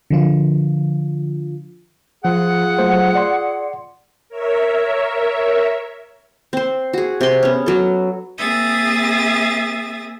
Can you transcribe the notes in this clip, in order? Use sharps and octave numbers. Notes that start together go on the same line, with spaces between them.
D3 F3 F4
F3 F4 G#4 F#5
F#3 A3 C5
D5 C6
A#4 C#5 E5
C4 C5
F#4 G#4
C3 C6
B3 C#4
F#3 A4
A#3 C4 G#4 E5 D#6 A6